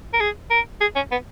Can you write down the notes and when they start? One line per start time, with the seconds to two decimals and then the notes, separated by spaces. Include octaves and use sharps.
0.13 A#4
0.20 G#4
0.50 A#4
0.81 G#4
0.96 C#4
1.11 B3